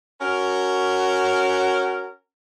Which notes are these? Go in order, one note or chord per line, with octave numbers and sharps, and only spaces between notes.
C#4 F#4 A#4